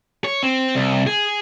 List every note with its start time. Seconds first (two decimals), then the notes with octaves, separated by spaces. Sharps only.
0.24 C#5
0.43 C4
0.75 C2
1.07 G#4